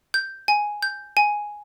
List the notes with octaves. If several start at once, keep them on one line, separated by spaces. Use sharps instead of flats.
G6
G#5
G6
G#5